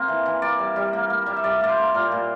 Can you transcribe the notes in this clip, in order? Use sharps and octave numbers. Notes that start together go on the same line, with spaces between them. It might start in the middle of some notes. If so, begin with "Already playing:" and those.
Already playing: A#3 C4
E3
E3
A#3 D5
G3
G3
A#3
A#3
G3
E5
G3 D5
A#3 D5
C5
A#3
A#2 A#4
A#2